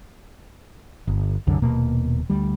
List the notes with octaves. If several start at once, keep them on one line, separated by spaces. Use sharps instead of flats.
G1
C2 F#2 D3
D#1 B2 A#3
D2 G3